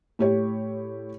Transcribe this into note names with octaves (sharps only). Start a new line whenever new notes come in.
A2 G4 C#5